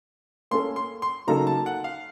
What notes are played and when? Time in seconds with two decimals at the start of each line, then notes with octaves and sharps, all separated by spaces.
0.51 A#3 C#4 A4 C6
0.76 C6
1.02 C6
1.27 C#3 F#3 A#3 D#4 A4 A#5
1.47 A5
1.66 F#5
1.84 F5